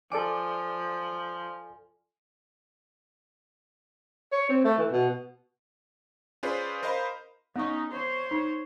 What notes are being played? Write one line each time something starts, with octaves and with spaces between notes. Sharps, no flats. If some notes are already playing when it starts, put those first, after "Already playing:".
F3 A4 D5 G#5 D6
C#5
C4
A3
E3
B2
C#4 F4 G#4 B4 C5 D5
A#4 C5 D#5 F5 B5
B3 C#4 D#4 C#6
C5 C#5
D#4